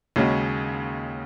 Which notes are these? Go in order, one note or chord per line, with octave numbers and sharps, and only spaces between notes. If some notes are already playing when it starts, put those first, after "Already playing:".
D#2 C#3 G#3 C#4 F#4